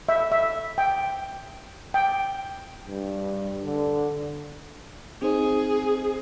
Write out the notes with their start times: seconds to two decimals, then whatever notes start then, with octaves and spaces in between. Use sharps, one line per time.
0.09 E5
0.32 E5
0.78 G5
1.94 G5
2.88 G2
3.64 D3
5.22 C4 D#4 G#4 C5